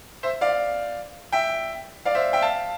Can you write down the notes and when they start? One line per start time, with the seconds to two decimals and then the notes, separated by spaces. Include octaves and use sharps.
0.23 C5 E5
0.41 D5 F5
1.32 E5 G5
2.05 D5 F5
2.15 C5 E5
2.33 E5 G5
2.42 F5 A5